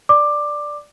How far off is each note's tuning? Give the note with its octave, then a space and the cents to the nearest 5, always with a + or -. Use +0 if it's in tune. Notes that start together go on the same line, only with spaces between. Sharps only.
D5 +0 D6 +15